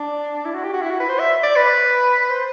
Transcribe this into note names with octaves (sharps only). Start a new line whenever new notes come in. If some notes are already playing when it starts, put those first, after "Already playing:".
Already playing: D4
E4
F#4
G4
F#4
E4
F#4
B4
C5
E5
D5
B4
C5